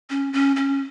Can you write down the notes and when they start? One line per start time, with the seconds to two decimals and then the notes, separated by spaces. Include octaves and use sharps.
0.10 C#4
0.33 C#4
0.56 C#4